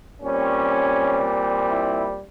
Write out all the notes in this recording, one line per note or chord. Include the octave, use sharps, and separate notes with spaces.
A#2 G3 C4 C#4
E4